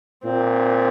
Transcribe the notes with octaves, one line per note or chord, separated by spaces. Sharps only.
A#2 C4